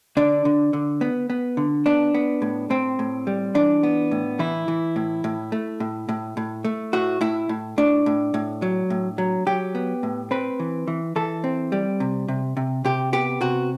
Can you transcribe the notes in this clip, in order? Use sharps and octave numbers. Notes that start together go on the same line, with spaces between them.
D3 D4
D3
D3
B3
B3
D3
B3 D4
B3
A2
A2 C4
A2
G3
E3 D4
B3
A2
E3 E4
E3
A2
A2
A3
A2
A2
A2
A3
A2 F#4
A2 E4
A2
A2 D4
A2
A2
F#3
A2
F#3
F#3 G4
B3
A2
C4 B4
E3
E3
E3 A4
C4
G3
C3
C3
C3
C3 G4
B3 G4
C3 F#4